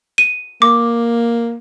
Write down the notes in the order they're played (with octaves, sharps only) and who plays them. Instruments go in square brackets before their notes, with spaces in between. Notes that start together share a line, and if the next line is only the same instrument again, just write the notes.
[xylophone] D#7
[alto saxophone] A#3 [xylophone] D6